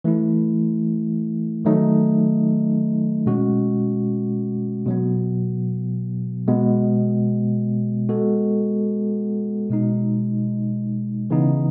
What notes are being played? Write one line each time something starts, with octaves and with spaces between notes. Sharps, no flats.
E3 A3 E4
D#3 F#3 A3 D#4
B2 G#3 C#4 F#4
B2 F#3 B3
B2 G#3 B3
G#3 B3 F#4 A4
B2 G#3 D#4
C#3 E3 B3 D#4